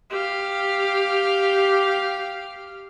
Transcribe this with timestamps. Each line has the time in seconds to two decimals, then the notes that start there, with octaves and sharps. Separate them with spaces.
0.10 G4 F5